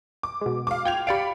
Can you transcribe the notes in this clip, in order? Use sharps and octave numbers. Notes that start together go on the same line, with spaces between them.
D6
B2 G#3
F5 D6
F4 G5 G#6 F7
G4 D5 F5 B5 C#7 D7